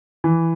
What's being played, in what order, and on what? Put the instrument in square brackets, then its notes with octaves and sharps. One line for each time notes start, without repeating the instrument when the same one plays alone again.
[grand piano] E3